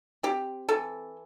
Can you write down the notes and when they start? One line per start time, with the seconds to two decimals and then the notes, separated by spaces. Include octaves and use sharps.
0.23 C4 G4
0.69 E3 A4